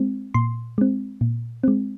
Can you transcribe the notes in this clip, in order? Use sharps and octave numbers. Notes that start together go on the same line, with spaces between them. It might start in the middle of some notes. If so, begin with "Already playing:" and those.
Already playing: G#3 C4
A#2 C6
G#3 C4
A#2
G#3 C4